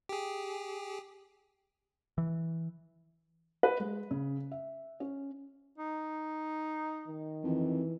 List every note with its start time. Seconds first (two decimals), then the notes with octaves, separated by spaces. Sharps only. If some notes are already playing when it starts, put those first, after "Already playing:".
0.09 G4 G#4
2.18 E3
3.63 B4
3.80 G#3
4.11 C#3
4.51 E5
5.00 C#4
5.78 D#4
7.08 D#3
7.44 F2 E3